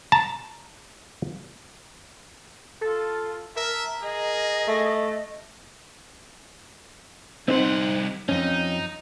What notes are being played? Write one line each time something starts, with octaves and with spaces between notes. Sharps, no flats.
A5 A#5
F4 A4
A#4 E5 A5
G#4 D#5
A3
C2 C4 D#4 C5 F#5
F2 C#4 D#4